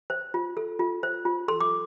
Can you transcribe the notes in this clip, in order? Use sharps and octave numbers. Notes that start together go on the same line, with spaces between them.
C5
F4
A4
F4
C5
F4
A4 C6
D6